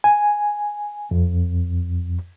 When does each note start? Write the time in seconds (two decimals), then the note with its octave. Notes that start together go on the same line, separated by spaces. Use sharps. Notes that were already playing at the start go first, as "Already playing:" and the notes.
0.04 G#5
1.11 F2